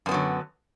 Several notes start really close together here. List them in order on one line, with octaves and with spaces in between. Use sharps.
F#2 B3 F#3 D3